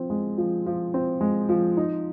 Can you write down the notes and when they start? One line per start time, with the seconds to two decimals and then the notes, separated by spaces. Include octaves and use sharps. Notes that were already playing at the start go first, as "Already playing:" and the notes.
Already playing: F3 C4
0.10 G#3
0.38 F3
0.66 F3
0.94 C4
1.21 G#3
1.49 F3
1.77 D#4